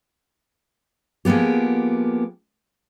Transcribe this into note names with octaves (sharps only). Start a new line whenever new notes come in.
F3 G#3 A#3 B3 G4